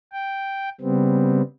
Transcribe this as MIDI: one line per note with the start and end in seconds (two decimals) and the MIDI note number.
0.13 0.69 79
0.81 1.42 49
0.81 1.42 55
0.81 1.42 59
0.81 1.42 60